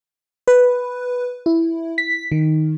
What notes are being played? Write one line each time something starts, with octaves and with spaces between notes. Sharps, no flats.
B4
E4
B6
D#3